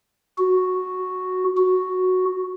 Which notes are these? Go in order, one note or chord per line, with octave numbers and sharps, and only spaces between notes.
F#4
F#4